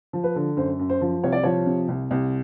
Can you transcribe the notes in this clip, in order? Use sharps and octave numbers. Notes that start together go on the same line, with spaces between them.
F3
B4
D3
F#2 C5
F#2
C5
F3
C2 C#5
D5
F3 C#5
C3
C2
C2